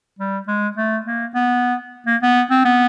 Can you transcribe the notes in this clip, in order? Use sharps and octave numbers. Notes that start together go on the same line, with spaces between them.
G3
G#3
A3
A#3
B3
A#3
B3
C4
B3